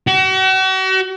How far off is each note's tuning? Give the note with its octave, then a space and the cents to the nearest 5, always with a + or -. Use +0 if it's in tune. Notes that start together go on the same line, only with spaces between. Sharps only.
F#4 +40